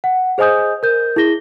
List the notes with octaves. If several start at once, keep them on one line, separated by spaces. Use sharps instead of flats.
F#5
G#4 C5 D#5 G#5 D#6 G6
A#4 G6
E4 G#4 A#6 G7